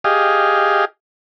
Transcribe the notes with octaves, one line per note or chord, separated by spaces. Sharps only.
G4 G#4 D#5 F5